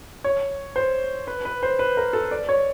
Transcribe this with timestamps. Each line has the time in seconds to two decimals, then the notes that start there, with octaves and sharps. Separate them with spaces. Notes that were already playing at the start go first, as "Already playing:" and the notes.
0.24 C#5
0.76 C5
1.27 B4
1.45 B4
1.63 C5
1.79 B4
1.97 A#4
2.13 A4
2.31 D5
2.49 C#5